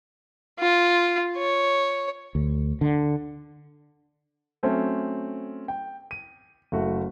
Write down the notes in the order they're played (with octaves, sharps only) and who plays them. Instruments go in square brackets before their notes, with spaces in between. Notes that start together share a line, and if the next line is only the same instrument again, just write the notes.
[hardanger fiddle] F4
C#5
[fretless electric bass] D2
D3
[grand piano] F#3 A3 C4 C#4
G5
D#7
F#1 A3 F#4